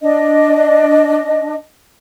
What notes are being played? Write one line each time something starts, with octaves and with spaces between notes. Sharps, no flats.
D4 D#5